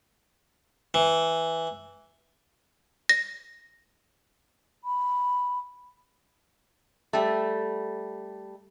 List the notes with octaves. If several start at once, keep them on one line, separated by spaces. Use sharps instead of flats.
E3
A#6
B5
G3 A3